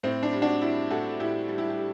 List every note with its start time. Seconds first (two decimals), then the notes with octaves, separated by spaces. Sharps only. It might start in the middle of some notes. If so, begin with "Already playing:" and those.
0.03 A2 C4
0.23 D4
0.32 G3
0.42 D4 F#4
0.61 G3 E4 G4
0.90 A2 F#4 A4
1.19 A2 E4 G4
1.48 G3
1.58 E4 G4
1.70 G4
1.78 G3